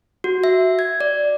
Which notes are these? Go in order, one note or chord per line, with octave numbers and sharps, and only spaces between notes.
F#4
E5
G#6
D5